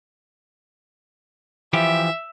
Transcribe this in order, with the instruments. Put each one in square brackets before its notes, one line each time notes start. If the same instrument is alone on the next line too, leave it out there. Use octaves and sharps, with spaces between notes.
[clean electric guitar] E3 F3 G4 [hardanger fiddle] E5